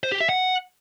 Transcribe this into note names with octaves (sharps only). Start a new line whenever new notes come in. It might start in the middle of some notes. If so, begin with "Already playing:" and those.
C5
G4
E5
F#5